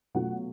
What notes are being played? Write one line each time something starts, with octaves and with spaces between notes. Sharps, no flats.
B2 F#3 A3 C#4 F4 F#5